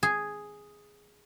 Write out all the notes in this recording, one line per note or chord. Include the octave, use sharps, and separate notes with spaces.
G#4